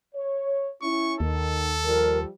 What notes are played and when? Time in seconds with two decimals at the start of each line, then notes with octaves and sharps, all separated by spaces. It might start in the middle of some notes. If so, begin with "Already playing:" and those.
0.14 C#5
0.82 C#4 E4 C#6
1.20 D#2 D#3 A4
1.84 F3 G3 A#4